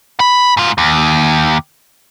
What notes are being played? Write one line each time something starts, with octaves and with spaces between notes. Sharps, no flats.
B5
G#2 F4
D#2